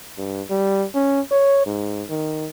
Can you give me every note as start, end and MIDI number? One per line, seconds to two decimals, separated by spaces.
0.18 0.42 43
0.50 0.85 55
0.95 1.21 61
1.31 1.63 73
1.66 2.03 44
2.10 2.49 51